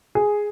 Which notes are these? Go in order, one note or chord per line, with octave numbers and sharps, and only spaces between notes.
G#4